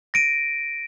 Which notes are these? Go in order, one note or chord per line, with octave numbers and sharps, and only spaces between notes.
A#6 D7 D#7